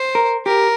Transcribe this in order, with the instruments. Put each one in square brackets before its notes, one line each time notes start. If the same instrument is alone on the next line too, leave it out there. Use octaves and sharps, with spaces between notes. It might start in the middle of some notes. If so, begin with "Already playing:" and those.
Already playing: [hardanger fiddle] C5
[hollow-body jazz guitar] A#4
[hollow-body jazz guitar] G4 [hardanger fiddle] A#4